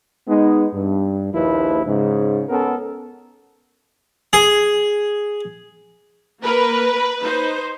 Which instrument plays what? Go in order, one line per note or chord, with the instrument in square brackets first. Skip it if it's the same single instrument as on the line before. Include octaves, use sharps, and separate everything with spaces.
[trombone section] G#3 B3 D#4
G2
A#1 D#2 F3 E4 B4
G#2 C#3
B3 C#4 A4 A#4
[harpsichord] G#4
[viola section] A#3 A#4 [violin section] B4
[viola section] D#4 C5